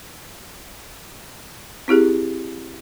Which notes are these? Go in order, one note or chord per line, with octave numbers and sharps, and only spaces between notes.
C4 E4 G4 G#4